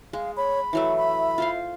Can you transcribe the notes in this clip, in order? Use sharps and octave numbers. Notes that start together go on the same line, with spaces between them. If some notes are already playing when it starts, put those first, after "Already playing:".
G#3 F5
C#5 B5
E3 F#3 A3 E5
B5
F4 C5 F5